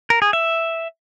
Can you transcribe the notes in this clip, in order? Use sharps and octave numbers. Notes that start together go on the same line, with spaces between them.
A#4
G#4
E5